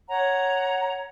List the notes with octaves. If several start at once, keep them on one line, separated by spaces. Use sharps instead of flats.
C#5 F#5 A#5